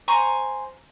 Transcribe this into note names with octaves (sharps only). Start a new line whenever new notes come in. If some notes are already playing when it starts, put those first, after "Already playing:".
C5 G#5 A#5 C#6